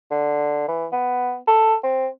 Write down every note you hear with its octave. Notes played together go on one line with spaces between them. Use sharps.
D3
E3
B3
A4
C4